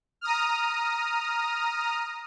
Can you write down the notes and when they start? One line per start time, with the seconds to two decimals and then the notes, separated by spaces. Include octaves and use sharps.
0.21 A#5 D#6 F6